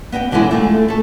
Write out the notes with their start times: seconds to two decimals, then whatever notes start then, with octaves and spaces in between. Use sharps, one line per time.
0.12 B3 D#5 E5 G5
0.31 B2 D3 E3 F#3 G#3 E4
0.51 A3 F4 G#4
0.88 A3 A4